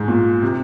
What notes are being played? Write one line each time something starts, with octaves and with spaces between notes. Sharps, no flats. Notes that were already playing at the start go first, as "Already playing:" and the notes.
Already playing: G#2
A#2
C3